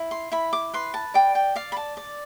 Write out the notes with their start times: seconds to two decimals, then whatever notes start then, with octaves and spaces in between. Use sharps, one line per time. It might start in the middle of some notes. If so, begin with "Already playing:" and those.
Already playing: E4
0.11 C6
0.32 E4 B5
0.53 D6
0.74 B4 C6
0.94 A5
1.14 D5 G5
1.35 G5
1.55 D5 F5
1.72 B5
1.77 A5
1.97 D5